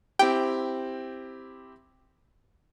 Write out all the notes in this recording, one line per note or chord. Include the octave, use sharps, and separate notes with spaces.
C4 E4 G4 G5